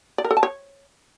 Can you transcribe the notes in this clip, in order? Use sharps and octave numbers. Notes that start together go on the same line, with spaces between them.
D5
A#4
A4
A5
C#5